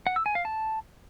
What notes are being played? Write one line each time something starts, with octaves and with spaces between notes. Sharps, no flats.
F#5
E6
G#5
F5
A5